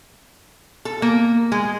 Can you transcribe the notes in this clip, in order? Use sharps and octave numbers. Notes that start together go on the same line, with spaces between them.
A4
A#3
G#3